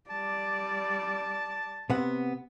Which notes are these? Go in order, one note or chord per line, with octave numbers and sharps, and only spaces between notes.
G3 D5 A5
C3 B3 F#5